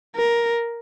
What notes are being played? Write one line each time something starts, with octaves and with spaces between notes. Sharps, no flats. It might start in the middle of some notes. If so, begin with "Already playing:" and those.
A#4